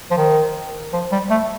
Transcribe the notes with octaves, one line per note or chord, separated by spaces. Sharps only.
F3
D#3
F3
G3
A3